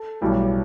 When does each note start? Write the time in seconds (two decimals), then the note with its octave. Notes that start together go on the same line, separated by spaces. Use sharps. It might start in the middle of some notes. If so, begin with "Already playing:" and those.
Already playing: A4
0.21 B1 A2 E3 G3